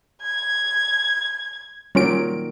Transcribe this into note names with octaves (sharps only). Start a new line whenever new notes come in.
G#6
A#2 D#3 F#3 G3 C#4 D7